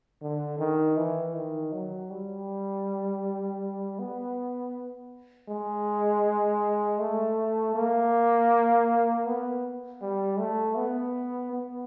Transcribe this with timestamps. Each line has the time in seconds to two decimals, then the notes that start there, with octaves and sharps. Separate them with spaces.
0.22 D3
0.59 D#3
0.97 E3
1.34 D#3
1.72 F#3
2.10 G3
3.99 B3
5.49 G#3
7.00 A3
7.75 A#3
9.27 B3
10.02 G3
10.39 A3
10.77 B3
11.53 B3